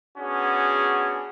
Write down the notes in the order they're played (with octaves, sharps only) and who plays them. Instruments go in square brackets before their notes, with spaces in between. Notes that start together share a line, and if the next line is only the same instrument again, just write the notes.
[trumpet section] B3 C#4 D4 F#4 G#4